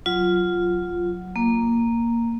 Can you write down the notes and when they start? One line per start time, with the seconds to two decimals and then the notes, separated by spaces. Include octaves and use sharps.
0.06 F#3 F4
1.36 A#3